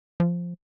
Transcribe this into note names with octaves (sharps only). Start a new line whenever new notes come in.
F3